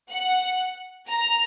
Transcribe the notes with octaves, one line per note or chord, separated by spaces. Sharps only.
F#5
A#5